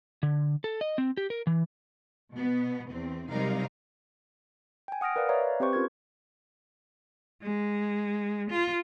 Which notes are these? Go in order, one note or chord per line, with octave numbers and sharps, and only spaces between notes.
D3
A4
D#5
C4
G4
A#4
E3
B2 B3
E2 C4
C3 F#3 G3 D#4 A#4 F5
G5 G#5
F#5 D#6 F6 A#6 D7
A#4 B4 D5 F5
B4 C#5 D5 E5 F5 A#5
C4 G4 B4 C5 C#6
C#4 F4 G4 A#4 G#6
G#3
F4